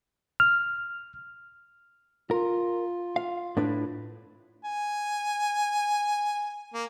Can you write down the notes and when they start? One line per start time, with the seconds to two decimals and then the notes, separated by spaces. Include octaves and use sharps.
0.40 F6
2.31 F4 A#4
3.16 F5
3.57 A2 D4 B4
4.65 G#5
6.74 A#3